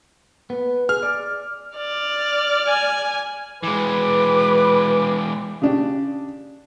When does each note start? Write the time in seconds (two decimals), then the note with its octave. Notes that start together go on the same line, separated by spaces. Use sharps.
0.50 B3
0.89 G#4 F6
1.03 D5
1.77 D5 F6
2.68 G#5
3.63 E3 G#3 B4 D6
5.62 C#3 D4 G4